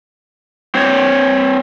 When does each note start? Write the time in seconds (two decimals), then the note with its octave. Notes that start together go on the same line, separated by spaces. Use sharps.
0.75 C4 C5 C#5